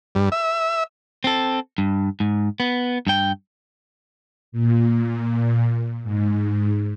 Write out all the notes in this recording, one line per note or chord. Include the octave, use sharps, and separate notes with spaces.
G2
E5
C4 A4
G2
G#2
B3
G2 G5
A#2
G#2